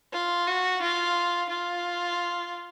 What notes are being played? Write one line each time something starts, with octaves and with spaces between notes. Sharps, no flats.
F4
F#4
F4
F4